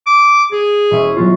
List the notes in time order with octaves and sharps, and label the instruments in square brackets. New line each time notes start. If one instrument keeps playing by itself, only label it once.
[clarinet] D6
[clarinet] G#4 [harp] D7
[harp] E1 C#4 E5
F#3 B3 F4